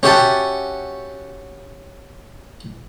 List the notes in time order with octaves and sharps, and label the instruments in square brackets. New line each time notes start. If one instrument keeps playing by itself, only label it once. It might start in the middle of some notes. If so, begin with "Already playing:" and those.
[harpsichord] C#4 F#4 G4 E5 F#5 A5